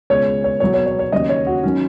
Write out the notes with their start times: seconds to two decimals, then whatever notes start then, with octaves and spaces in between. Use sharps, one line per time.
0.10 C#2 B2 G#3 C#5
0.44 C#5
0.60 B1 B2 F#3 C#5
0.74 C#5
0.86 C#5
0.99 C#5
1.12 D#2 C#3 F#3 D#5
1.29 C#5
1.47 F#4
1.63 D#3 F#3 C#4